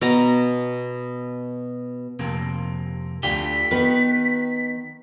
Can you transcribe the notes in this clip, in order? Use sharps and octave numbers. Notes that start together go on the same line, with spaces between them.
B2 A#5
F2 C3 A#3
D2 D3 F4 G4 B6
D#3 B3 B4